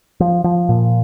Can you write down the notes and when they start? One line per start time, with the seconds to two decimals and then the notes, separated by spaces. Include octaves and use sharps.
0.20 F3
0.44 F3
0.69 A#2